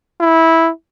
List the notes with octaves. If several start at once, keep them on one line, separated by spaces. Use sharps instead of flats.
E4